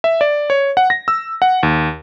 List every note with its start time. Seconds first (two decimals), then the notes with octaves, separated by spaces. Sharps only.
0.04 E5
0.21 D5
0.50 C#5
0.77 F#5
0.90 A#6
1.08 E6
1.42 F#5
1.63 D#2